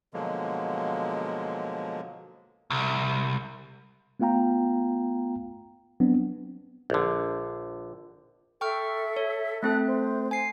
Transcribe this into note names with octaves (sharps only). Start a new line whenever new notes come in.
B2 D3 F3 F#3 G#3 A#3
C2
A3 B3 F4 F5 G5 A#5
F#3 B3 C4 D4
A#1 D3
A4 E5 G5 C#6 F6
C#5
A3 C4 A4 A5 F#6
C5
G#5 C7